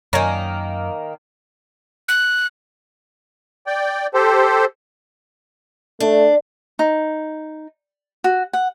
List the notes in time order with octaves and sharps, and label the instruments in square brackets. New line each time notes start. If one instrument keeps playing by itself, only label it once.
[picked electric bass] F#2 [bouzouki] D#3 A#3 [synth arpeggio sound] A#4 C#5 G#5
[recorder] F#6
[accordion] D5 G5
G4 A4 C5
[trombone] A3 [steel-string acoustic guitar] D4
[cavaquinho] D#4
F#4
F#5